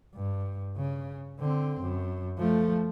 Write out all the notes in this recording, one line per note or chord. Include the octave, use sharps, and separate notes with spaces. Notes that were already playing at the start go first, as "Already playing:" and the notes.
G2
C#3
D3 C4
F#2
F3 A3